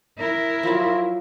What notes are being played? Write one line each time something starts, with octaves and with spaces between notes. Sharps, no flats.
E4 A#4
F3 F#3